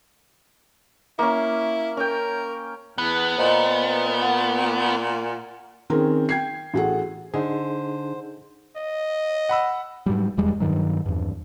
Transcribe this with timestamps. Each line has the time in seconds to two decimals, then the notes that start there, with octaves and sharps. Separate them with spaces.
1.19 A#3 C#4 E4
1.97 C#4 A#4 G5
2.98 E2 B3 F#6
3.38 A#2 C5 D#5 A#5
4.22 F#5
5.90 D#3 C4 C#4 G#4 A#4
6.29 G5 G#6 C7
6.74 A1 F#4 G#4 A4 F#5
7.34 D3 D4 D#4 G#4 C5
8.76 D#5
9.49 F#5 B5 E6
10.06 G#2 F#3 G3
10.37 F1 E2 G3 G#3
10.60 G2 D#3 F#3
11.06 E2 G2